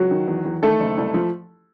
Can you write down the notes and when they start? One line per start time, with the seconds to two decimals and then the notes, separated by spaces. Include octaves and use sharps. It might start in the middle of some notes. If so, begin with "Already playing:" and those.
Already playing: C#2 F#3 F#4
0.11 D#3
0.28 E2
0.45 E2
0.62 D#3 A3 A4
0.80 F#1
0.97 C2
1.14 F3